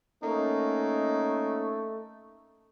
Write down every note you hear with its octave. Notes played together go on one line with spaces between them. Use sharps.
A3 A#3 C#4 D#4